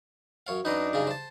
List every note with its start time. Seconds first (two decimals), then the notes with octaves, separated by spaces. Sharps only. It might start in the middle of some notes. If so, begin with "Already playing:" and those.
0.47 F#2 C#5 F5
0.65 F#2 D4 D#4 B4 D#5 A#5
0.93 G2 C#3 G#4
1.07 C5 A5